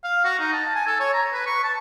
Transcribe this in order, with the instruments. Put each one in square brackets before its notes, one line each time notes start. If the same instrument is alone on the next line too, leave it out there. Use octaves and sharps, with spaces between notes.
[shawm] F5
F#4
D#4
A5
G#5
A4
C#5
A#5
B4
C#6
A5